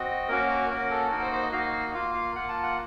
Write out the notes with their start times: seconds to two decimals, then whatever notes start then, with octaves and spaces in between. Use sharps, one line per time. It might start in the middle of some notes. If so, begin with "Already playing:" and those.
Already playing: C4 F#4 D#5
0.29 A#3 C#4 F#4 A#4
0.70 A#3 C#4 F#4 A#4
0.90 A4
1.11 A#3 D#4 F#4 A#4
1.22 C5
1.32 C5
1.43 D#5
1.52 A#3 D#4 F#4 F5
1.94 A#3 F4 F5
2.14 F5
2.36 A#3 F4 F#5
2.49 A5
2.63 F#5